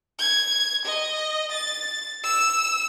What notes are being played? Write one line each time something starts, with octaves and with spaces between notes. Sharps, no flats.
G#6
D#5
A6
E6